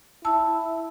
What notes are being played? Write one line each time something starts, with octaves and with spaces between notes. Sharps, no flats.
E4 A5 E6